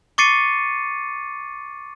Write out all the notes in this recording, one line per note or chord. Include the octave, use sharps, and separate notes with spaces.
C#6 D6 A6 C7 C#7 D#7